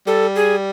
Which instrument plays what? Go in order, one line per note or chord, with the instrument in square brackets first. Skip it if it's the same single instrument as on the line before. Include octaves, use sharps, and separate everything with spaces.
[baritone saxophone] G3 [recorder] A4
[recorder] G#4